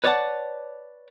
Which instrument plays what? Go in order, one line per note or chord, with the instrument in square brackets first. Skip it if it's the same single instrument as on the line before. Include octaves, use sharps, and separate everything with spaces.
[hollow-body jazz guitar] B4 C#5 D5 E5 F#5 A5